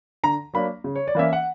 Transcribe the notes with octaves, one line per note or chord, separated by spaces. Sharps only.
D3 A#5
F#3 A#3 D4 B5
C#3
C#5
D5
E3 A#3 C#4 E5
F#5